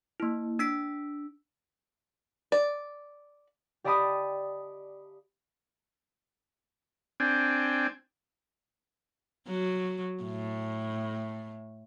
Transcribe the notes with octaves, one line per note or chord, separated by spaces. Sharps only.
A#3 E4
D4 E6 B6 D7
D5
G4 D5 D#5 A5 B5 D#6
C4 D4 G5 G#5
F#3
A2